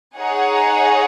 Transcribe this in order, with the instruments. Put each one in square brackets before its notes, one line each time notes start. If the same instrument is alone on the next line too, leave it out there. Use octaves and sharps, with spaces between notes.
[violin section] D#4 G#4 C#5 F#5